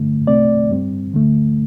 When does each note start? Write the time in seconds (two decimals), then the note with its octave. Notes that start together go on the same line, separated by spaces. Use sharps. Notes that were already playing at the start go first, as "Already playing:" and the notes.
Already playing: G2 D3 A3
0.27 C2 C3 A3 C4 D5
0.71 G2 G3 C4
1.13 D2 D3 A3